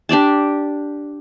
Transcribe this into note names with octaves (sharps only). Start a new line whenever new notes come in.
D4 G4 D5 A5